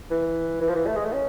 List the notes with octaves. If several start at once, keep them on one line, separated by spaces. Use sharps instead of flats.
E3
E3
F3
E3
A3
G#3
A3
C#4